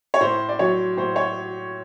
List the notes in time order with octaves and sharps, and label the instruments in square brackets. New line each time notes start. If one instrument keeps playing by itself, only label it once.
[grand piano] C#5
A2 C5
D5
F#3 C#5
A2 C5
C#5